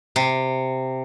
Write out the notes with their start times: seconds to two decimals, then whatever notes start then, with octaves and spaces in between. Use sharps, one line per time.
0.16 C3